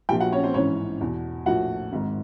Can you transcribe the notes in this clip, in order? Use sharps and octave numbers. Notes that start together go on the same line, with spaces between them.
A#1 A#2 F3 G4 G5
F#4 F#5
C#4 C#5
C4 C5
A1 G#2 E3 C#4 C#5
E2 B2
A#1 A2 F3 F#4 F#5
G#1 G#2 D#3